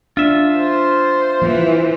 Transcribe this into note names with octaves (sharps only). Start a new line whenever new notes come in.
D4 F4 E5
C5
E3 F3